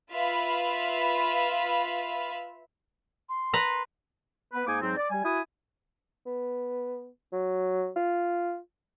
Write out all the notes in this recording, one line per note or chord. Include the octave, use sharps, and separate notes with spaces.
F4 B4 E5 F5 B5
C6
B4 A#5
B3 B4
G#2 A#3 D#4 G#5 D6
G#2 F#3 C4
D5
G3 G#5
E4 F#4 G#5 B5 D#6
B3
F#3
F4